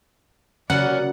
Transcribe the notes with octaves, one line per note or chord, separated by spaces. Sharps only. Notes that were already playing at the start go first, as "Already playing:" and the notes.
C#3 F#3 A#3 C#4 D5 F#5